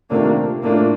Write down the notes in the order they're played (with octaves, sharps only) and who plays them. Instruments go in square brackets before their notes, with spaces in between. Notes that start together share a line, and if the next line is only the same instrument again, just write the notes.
[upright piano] C3 D#3 A3 D4 F4 [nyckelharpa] A#3
[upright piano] A2 A3 D4 F4 [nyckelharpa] A#3